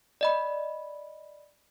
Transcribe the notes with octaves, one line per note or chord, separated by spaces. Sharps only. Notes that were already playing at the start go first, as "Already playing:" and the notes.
D5 D#5 B5